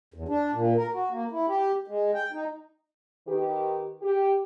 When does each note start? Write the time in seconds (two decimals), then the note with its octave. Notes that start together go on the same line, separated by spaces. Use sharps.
0.14 E2
0.29 D4
0.53 A#2
0.77 A#4
0.94 F#4
1.11 A#3
1.31 E4
1.48 G4
1.88 G#3
2.14 G5
2.33 D#4
3.28 D#3 G4 B4
4.02 G4